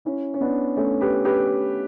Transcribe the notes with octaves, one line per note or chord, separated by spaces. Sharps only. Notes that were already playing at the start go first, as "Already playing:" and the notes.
C#4 E4
C#4
B3 D4
A3 C#4
G4 B4
G4 B4